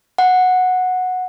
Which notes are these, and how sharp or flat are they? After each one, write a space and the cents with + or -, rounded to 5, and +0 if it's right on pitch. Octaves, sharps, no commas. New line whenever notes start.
F#5 -10